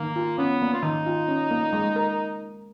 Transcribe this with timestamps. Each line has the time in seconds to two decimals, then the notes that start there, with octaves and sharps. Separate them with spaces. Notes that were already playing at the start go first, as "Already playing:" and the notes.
Already playing: D#3 A#3
0.16 F4
0.38 B3 C#4
0.62 A#3
0.74 F4
0.83 D#3 D#4
1.06 F4
1.28 C#4
1.51 A#3
1.73 G#3
1.96 A#4